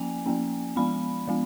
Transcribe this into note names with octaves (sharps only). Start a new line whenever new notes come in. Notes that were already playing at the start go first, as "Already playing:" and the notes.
Already playing: F3 A#3 C#4 G#5
F3 A#3 C#4
F3 G#3 B3 B5
F3 G#3 B3